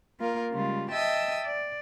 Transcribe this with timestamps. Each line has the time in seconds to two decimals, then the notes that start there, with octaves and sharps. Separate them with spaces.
0.20 A#3 F4 A#4
0.51 C#3 G3 G#3 F4
0.91 D#5 E5 G5 A5 D#6 E6
1.45 D5